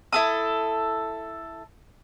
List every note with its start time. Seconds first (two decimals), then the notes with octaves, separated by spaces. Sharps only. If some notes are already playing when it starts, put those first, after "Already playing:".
0.13 E4 A4 D#6